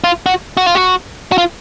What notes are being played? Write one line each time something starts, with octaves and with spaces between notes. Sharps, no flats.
F4
F#4
F#4
F4
F#4
F#4
F4